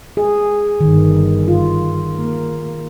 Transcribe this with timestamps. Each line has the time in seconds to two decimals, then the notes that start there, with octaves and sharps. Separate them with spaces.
0.17 G#4
0.81 G1 D#3
1.48 F4
2.14 A#3